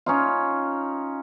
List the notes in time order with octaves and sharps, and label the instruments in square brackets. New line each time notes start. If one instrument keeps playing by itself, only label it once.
[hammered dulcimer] C#4 D#4 F4